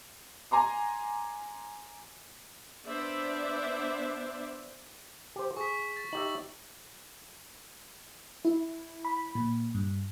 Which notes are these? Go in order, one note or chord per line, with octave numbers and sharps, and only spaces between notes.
G#5 A#5 C6 D6
B3 D4 C5 D5 E5
G4 C5
G#4 C#6 B6
A6
D#4 G4 E5 F#7
E4
B5
A#2
G2